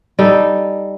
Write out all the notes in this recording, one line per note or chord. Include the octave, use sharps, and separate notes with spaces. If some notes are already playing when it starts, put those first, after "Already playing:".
G3 D#4 A4